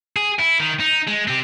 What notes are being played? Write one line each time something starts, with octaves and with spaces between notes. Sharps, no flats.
G#4
E4
D#3
D#4
G#3
C4 G4